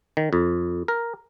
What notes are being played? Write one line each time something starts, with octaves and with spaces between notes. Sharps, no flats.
D#3
F2
A#4